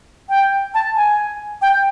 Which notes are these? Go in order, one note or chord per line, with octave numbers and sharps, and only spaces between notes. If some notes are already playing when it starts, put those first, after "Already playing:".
G5
A5
G#5
G5